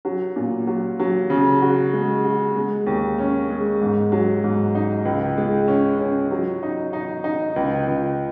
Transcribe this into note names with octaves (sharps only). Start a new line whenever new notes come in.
F#3
A#2
F#3
F#3
C#3
F#4
G#3
F#4
G#3
D#2
C#4
G#3
G#2
F#3
G#2
D#4
C#2
G#3
C#4
C#4
F#3
D#4
D#4
D#4
C#2
C#2